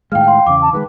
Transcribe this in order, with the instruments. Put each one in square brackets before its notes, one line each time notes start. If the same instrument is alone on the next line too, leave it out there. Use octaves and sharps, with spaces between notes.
[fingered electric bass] A2 D#3 G#3 [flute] F5 [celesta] G5 F6
[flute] F5 [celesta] G5 C6
[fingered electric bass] E2 C#3 [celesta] D6
[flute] A5
[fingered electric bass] D#3 G3 G#3 [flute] B4